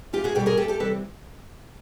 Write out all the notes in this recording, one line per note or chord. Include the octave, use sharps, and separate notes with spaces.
E2 F4 G4
F#4 G#4
B2 G3 G4 A4
G#4 A#4
E2 G4 A4
G4 A4
C3 E3 G3 C4 A4 B4